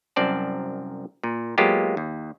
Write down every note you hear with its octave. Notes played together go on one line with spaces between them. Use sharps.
C2 F#2 C4 D5 A5
A#2
F#3 G#3 A#3 B3 F4 G4
D#2